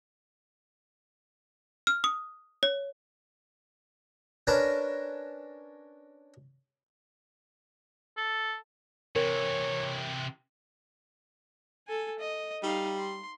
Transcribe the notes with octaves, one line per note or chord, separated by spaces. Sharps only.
F6
D#6
C#5
C#4 D4 A#4 B4 A5 A#5
A4
C3 E3 A#4 C#5
A4 G#5
D#5
G3 D#4 F5
C6